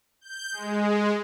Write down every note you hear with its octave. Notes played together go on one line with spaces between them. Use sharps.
G6
G#3